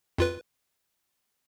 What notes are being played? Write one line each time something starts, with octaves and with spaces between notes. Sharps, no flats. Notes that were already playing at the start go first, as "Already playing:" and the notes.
F2 F4 B4